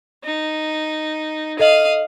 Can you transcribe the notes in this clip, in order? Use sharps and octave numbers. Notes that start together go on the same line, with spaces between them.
D#4
A4 D#5 F5 D#6 F#7